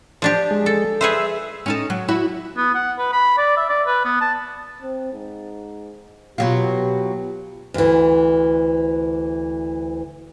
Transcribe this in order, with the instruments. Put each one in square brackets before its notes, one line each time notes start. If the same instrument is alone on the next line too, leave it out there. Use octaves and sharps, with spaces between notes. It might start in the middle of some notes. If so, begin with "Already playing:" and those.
[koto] F3 D4 G4
[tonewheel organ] G#3
[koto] A4
[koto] G#4 B4 C5 [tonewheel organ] E5
[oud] C#4 D#4 A4
F#3
E4 F#4 E5
[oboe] B3
F#5
B4
B5
D5
E5
D5
B4
B3
A5
[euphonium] C4
G#2
[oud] B2 F#3 F4 [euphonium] G4
[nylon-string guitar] D2 E3